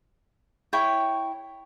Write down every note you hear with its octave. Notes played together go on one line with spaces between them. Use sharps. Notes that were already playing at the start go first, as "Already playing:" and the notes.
E4 C#5 G5